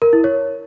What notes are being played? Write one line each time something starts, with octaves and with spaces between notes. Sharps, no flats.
A#4
E4
C#5